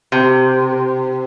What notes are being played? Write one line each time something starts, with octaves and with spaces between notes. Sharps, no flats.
C3